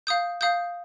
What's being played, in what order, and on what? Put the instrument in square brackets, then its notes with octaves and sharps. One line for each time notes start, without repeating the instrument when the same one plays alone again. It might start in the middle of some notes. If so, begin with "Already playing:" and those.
[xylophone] F5 D#6 G6
F5 D#6 G6